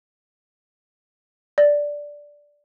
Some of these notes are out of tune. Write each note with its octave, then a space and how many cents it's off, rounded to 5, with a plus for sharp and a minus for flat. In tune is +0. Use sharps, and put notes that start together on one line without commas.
D5 -5